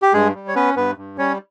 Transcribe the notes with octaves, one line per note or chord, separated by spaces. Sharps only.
G4
G2 G#3 G#4
G3
C#5
B3 C#4 B4
G2 B3 B4
G2
G3 C#4 C#5